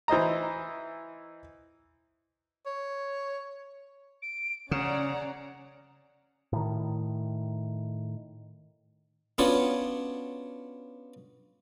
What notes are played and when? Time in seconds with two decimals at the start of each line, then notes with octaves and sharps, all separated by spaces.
0.08 E3 C5 D#5 A#5
2.66 C#5
4.22 D7
4.71 C#3 C#4 D5 F#5 A#5
6.53 A2 D#3
9.38 B3 C#4 D4 F4 F#4 C#5